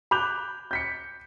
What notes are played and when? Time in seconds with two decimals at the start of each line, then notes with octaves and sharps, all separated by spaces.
0.11 B5 D6 F#6 G6 F7
0.71 G6 B6 C#7